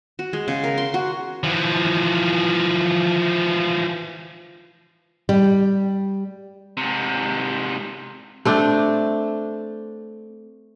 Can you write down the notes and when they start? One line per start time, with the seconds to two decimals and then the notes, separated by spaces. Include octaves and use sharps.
0.19 F#4
0.33 G#3
0.48 C#3
0.64 A#4
0.78 C6
0.94 F#4
1.44 E3 F3
5.29 G3
6.77 G#2 C3
8.45 A3 C4 D4